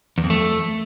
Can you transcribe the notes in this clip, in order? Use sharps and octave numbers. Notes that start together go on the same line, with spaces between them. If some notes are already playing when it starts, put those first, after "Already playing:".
E2
F2
A3